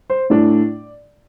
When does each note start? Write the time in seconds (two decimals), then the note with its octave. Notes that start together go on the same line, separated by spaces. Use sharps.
0.10 C5
0.30 A2 A3 D4 D5